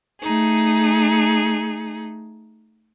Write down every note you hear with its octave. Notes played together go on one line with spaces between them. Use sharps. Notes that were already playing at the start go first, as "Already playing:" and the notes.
A3 D#4 G#4